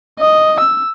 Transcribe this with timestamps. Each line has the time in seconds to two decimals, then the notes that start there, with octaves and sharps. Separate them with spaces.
0.20 D#5
0.60 E6